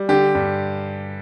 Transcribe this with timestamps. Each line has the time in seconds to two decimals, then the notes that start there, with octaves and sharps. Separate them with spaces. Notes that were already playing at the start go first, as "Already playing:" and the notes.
Already playing: G3
0.09 D3 G4
0.35 G2